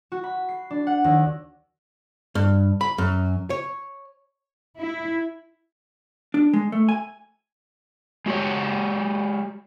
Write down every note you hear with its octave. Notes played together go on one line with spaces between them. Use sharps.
F#4
B5
C7
D4
F#5
D#2
G2
B5
F#2
C#5
E4
D4
G#3
A3
G#5
G#3 F#4 G4 C#5